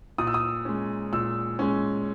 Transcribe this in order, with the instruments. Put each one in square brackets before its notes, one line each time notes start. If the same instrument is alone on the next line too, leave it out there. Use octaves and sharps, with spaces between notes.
[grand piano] A#2 D#6
E6
D#6
G#3 C#4
A#2 E6
G#3 C#4